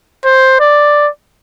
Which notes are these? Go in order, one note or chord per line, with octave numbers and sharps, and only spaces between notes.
C5
D5